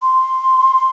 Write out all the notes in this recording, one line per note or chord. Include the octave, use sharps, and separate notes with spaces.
C6